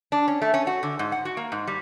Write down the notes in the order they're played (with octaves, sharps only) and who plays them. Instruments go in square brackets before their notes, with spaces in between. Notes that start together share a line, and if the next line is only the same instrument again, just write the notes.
[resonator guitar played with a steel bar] D4
C#4
A3
C#4
F#4
D3
G#2
F#5
F#4
A#3
G#2
G3